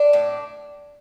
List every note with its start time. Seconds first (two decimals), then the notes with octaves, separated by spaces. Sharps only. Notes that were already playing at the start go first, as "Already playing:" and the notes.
Already playing: D4
0.13 A2